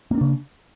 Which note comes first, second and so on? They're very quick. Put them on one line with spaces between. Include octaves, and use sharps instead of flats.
A#3 C4 D4 C#3